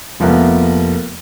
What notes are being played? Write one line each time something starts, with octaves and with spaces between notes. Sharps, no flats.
F1 F3 A#3 B3 A#4 E5